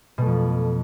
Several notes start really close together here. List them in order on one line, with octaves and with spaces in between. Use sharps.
B2 A3 F2